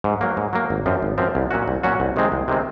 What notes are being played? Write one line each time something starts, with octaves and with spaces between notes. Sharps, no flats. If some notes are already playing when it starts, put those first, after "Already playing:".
G#2
F#3 A#3
G#2
F#3 A#3
G#1
F#2 F3 C4
G#1
F#2 F3 C4
C2
A#2 F#3 C#4 F#4
C2
A#2 F#3 C#4 F#4
C2
C3 D#3 G#3 C4
C2
C3 D#3 G#3 C4